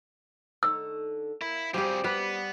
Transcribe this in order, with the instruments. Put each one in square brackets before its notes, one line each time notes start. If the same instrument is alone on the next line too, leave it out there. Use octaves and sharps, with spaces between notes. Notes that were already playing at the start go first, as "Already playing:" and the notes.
[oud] D3 D#4 C#5 [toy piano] E6
[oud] A#3 [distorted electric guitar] E4
[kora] G3 G4 [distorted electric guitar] C4 G#4 [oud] C#4 F4 C5
[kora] G3 B4 [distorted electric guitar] B3